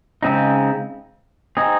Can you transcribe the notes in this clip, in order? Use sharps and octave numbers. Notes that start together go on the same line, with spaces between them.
C#3 G#3 C4 D#4
C4 D#4 G#4